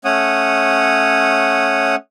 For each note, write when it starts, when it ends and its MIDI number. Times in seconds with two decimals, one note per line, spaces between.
0.05 1.95 57
0.05 1.95 61
0.05 1.95 73
0.05 1.95 78
0.05 1.95 87